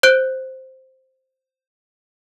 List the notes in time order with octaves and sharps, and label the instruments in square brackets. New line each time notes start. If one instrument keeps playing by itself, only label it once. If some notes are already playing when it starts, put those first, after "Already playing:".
[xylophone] C5 F#6 G6 D7 G7